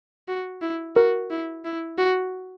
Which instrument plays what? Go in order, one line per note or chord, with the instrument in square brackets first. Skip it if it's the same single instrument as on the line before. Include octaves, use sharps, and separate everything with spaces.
[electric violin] F#4
E4
[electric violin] F#4 [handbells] A#4
[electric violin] E4
E4
F#4